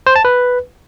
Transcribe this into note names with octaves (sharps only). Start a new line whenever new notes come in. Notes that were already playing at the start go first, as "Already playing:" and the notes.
C5
A5
B4